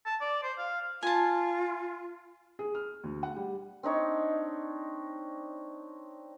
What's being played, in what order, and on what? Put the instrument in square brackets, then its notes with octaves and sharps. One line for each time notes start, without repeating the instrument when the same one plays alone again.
[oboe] A5
D5
C5
F5
[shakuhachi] F4 [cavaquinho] G#5 A5
[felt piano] G#4
F6
D2
F#5
G3
[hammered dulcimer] C4 D4 D#4 C#5